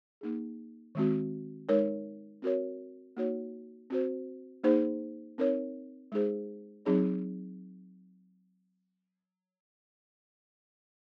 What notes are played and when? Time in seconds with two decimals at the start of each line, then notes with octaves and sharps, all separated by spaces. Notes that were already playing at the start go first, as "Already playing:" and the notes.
0.21 A#3 D#4 G#4
0.95 D#3 G#3 C4 F#4
1.69 G#3 D#4 A#4 C#5
2.42 C4 F#4 A#4 C#5
3.17 A#3 D#4 F#4 C#5
3.90 C4 F#4 C5
4.64 A#3 D#4 G#4 C5
5.38 C4 D#4 A#4 C#5
6.12 G#3 D#4 G#4 C5
6.85 F#3 C4 D#4 G#4 C#5